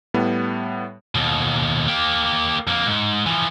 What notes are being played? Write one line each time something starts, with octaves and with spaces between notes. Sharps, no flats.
A2 G3 B3
D#2 B2
A#3 G4
F2 A#3
G#2
E3 F3